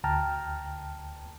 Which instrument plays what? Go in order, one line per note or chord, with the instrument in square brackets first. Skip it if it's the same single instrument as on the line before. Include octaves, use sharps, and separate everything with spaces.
[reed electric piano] D2 G5 A5 A#5 F6